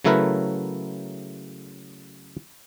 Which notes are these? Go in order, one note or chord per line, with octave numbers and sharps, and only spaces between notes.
C#3 F#3 A3 E4 A#4 B4